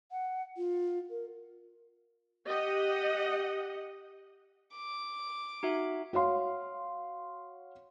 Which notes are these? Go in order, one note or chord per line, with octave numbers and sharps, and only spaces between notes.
F#5
F4
A#4
G4 D#5 F#5
D6
D#4 F#4 E5
F#4 C#5 F5 C6